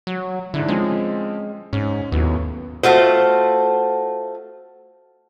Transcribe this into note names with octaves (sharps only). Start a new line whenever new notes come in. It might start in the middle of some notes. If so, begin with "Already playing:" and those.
F#3
G#2 D3 D4 E4
F3 G#3 C4 C#4
G#2 C#4
D#2 A2 F#3 B3
A3 F4 F#4 C5